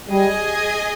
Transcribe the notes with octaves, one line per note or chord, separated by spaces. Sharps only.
G3 G#4 D#5 G#5